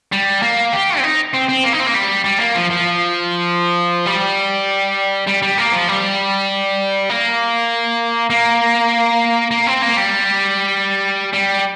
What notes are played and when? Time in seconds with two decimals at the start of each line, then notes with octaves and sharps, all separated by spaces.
0.12 G3
0.43 A#3
0.73 G4
0.98 C4
1.03 D#4
1.33 C4
1.48 C4
1.64 A#3
1.73 D#4
1.80 C4
1.86 A#3
1.94 G3
2.24 G3
2.39 A#3
2.55 F3
2.70 F3
4.06 G3
5.27 G3
5.43 G3
5.58 A#3
5.72 F3
5.88 G3
7.10 A#3
8.30 A#3
9.51 A#3
9.67 C4
9.82 A#3
9.97 G3
11.33 G3